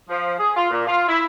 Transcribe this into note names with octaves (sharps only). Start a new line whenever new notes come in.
F3
G#4
F4
A#2
F4
E4